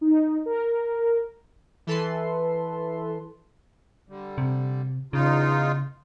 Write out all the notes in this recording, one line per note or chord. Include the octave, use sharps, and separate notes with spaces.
D#4
A#4
E3 A4 B4 C6
D3 G3
C3
E2 C#3 D#4 F4